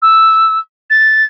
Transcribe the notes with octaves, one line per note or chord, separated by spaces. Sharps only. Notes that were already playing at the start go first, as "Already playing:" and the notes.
E6
A6